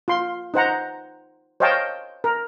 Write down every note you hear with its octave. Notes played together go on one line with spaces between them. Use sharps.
F4 C6
D#4 C5 F#5 A#5
C5 C#5 D#5 F5 G5 A5
A#4